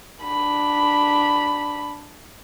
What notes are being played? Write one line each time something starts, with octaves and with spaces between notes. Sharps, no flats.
D4 B5